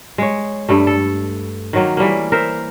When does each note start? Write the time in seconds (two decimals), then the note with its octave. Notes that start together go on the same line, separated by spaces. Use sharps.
0.18 G#3 C#5
0.69 G2 G3 A3
0.87 A4
1.73 D#3 F#3 A#3
1.97 E3 G3 A3 A#3
2.32 A#4 C5 E5